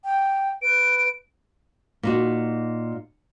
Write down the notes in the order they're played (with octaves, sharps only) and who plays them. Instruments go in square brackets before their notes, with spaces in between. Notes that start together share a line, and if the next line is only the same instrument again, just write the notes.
[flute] G5
[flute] B4 [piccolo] D7
[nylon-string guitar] A#2 D#4 F#4